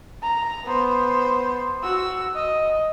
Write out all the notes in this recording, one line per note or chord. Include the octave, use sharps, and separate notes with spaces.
A#5
B3 C5
F#4 E6
D#5